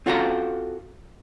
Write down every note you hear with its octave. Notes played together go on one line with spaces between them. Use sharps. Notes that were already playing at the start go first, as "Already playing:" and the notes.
C4 F4 F#4 A4 F5 A#5